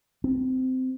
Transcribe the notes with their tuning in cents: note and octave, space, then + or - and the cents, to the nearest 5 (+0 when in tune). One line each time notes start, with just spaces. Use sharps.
C4 -20